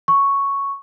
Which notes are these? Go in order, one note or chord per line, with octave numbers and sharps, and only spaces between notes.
C#6